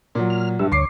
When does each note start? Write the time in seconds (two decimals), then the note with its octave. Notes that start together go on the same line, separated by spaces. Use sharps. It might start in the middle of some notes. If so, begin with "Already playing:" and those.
0.15 A#2 F#3
0.30 F6
0.59 G2 G3 E5
0.72 D2 C#5 D6 C7